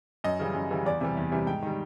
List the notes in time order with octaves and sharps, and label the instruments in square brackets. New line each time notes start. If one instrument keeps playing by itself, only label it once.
[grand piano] F#2 D#5
C#3 E3 G3
F#2
C#3 E3 G3
E2 D5
C3 E3 G3
E2
C3 E3 G3
G#2 G5
D#3 G3